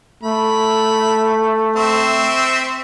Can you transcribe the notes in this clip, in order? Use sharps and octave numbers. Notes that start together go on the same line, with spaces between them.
A3 B5
C4 E5 C#6